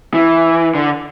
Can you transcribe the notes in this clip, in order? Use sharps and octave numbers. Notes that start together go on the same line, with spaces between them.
E3
D3